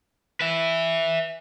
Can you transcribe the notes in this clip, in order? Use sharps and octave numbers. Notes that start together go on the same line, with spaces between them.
B4 E5